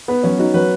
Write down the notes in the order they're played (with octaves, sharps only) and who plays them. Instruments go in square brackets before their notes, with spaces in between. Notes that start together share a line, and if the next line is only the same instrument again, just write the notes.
[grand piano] B3 [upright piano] B4
[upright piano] F#3 [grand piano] C#4
[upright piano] D#4 [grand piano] F#4
[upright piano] F#3 [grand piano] B4